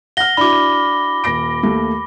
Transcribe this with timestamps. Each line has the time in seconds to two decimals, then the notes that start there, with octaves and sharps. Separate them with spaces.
0.17 F#5 F6 A#6 G7
0.37 D4 E4 F#4 B5 D6
1.24 D#1 A#6 D7
1.63 D#2 A3